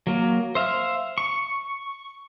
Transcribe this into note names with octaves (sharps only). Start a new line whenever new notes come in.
F#3 A#3
C5 E5 F5
C#6